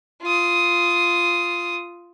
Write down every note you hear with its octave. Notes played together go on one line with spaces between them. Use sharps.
F4 D#6